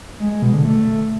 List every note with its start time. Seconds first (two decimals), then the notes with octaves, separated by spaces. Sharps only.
0.20 G#3
0.31 G#3
0.42 B2
0.54 D3
0.65 A3